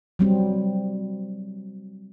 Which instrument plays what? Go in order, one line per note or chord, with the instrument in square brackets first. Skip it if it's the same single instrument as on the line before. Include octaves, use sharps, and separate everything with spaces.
[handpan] F#3 G3 C4